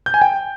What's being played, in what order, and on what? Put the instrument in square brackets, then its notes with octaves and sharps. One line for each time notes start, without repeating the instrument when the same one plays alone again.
[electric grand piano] G6
G#5
G5